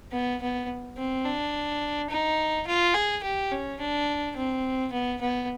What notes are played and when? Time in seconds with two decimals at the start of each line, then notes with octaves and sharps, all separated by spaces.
0.12 B3
0.42 B3
0.97 C4
1.25 D4
2.10 D#4
2.67 F4
2.95 G#4
3.24 G4
3.52 C#4
3.80 D4
4.36 C4
4.92 B3
5.21 B3